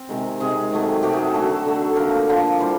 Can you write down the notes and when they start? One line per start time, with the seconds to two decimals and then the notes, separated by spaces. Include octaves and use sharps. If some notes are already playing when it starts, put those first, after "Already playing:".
Already playing: C4
0.09 C3 D#3 G#3
0.40 C3 D#3 G#3 G#4
0.71 C3 D#3 F#3 A3
1.03 C3 D#3 F#3 A3 G4
1.13 G#4
1.24 A4
1.34 D3 F#3 A3 A4
1.65 D3 F#3 A3
1.96 D3 F3 A#3 A#4
2.28 D3 F3 A#3
2.59 E3 G3 C5